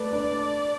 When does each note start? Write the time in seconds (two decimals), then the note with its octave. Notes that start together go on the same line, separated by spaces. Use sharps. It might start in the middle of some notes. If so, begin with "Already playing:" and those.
Already playing: A3 B4 D5
0.13 D4
0.32 D4